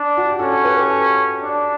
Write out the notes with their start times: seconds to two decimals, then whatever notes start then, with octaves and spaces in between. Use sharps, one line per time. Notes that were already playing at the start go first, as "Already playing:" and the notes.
Already playing: D4
0.17 F#4
0.28 G4
0.39 C#4 F#4 A4
0.52 A4 C#5
0.65 G4 B4
0.78 G4 B4
0.90 F#4 A4
1.43 D4